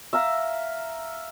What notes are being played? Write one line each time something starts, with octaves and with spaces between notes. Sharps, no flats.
E5 F5 A#5